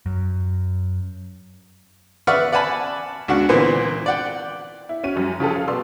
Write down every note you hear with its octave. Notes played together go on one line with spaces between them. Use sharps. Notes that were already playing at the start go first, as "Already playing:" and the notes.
F#2
B4 D5 E5 F#5 C#6 F6
D5 F#5 G#5 A5 B5
C#2 D4 F#4 F#5
A#2 D3 E3 B3 C4
D5 F#5 G5
E4
C#4 F#4 D#7
F#2 G3
C#3 F3 F4 G4 A4
F5
B2 B3 D5 C6 E6